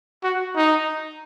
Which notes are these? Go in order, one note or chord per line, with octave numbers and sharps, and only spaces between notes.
F#4
D#4